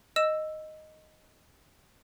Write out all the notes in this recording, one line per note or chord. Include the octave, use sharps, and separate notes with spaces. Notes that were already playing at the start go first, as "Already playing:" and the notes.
D#5 E6 E7